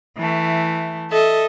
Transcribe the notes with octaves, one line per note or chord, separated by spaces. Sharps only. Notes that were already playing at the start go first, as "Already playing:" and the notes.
E3 A3
A4 D#5 E5